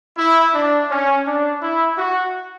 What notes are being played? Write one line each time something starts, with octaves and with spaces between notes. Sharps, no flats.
E4
D4
C#4
D4
E4
F#4